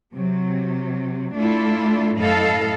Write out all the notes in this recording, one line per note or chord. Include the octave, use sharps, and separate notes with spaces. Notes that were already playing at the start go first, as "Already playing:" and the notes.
C3 F#3
A3 D4 E4 F4 A4
F#2 A2 E4 A4 D#5 F5